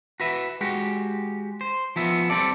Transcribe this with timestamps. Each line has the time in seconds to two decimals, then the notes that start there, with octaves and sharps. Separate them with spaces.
0.20 F#4 B4 E5
0.61 G#3 F#4 G4
1.61 C5
1.96 F3 B3 E5
2.30 G3 C4 A4 D5